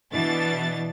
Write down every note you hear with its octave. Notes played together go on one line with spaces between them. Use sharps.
B2 E3 D4 A6